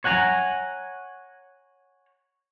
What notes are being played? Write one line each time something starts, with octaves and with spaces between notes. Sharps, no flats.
C#5 F#5 G#5 A#5